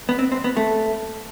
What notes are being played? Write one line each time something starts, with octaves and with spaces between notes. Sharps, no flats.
B3
C4
C4
B3
A3